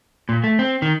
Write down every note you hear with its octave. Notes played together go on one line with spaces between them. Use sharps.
A#2
A3
C4
D#3